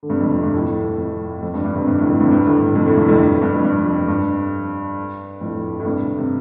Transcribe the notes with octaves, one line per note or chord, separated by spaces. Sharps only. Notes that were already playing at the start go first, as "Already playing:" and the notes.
D3
G2 C3
F2
F2
G2 C3
F2 A2
F2
F2
G2
G2
G2 C3
G2 C3
A2 D3
F2 A2
G2 C3
G2 C3
A2 D3
G2 C3
F2 A2
A2 D3
G2 C3
F2 A2
G2
G2
F2
G2
F2
G2
F2 A2
A2
G2 C3
C3